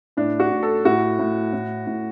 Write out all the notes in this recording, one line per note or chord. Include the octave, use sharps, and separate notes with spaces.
A2 D4
F#4
A2
A4
A2 F#4
A2
A2
A2